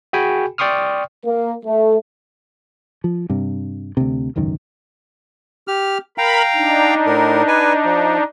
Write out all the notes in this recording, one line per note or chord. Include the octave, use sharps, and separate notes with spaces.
F#4 G#4 G5 G#5 B5
D5 G5 C6 C#6 D#6 F6
A#3
A3
F3
G2 C3
D2 C3
E1 C#2 F#2 D#3
G4 F6
A#4 F5 G5 A#5 B5
D4 D#4
A2 A#4
B4 G#5
F3